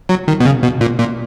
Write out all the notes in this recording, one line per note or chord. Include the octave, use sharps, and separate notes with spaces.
F#3
D#3
B2
C#3
B2
A#2
A#2